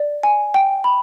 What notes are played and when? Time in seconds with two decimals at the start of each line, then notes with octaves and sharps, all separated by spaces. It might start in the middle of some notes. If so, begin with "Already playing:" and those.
Already playing: D5
0.23 G#5
0.54 G5
0.84 B5